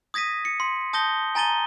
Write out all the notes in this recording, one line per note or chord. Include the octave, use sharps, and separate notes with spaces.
D#6 G#6 A#6 B6 D#7
C#7
C6
A5 D#6 G6 A#6 G7
G#5 A#5 A6 D#7 G7